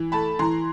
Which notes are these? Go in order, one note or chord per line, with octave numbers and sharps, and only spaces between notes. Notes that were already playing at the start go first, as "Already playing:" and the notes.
Already playing: E3
A3 A5 B5
E3 A#5 C6